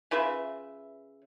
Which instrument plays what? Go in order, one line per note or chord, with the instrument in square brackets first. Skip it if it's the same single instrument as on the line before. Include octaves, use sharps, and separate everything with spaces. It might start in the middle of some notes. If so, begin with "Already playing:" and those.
[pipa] C#3 F4 B4 E5